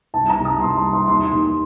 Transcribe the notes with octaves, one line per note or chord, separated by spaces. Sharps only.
C2 A5
A#5
C2
D#6
C2 C6
A#5
G3
C6
D#2 C6
D#3